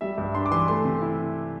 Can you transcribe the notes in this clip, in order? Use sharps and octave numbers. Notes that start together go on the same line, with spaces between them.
G3 E5
G2
D4 C6
D6
E3 C6
A3 C6
C3
E4